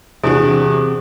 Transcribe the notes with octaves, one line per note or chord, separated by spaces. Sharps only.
E2 C3 D4 F#4 G#4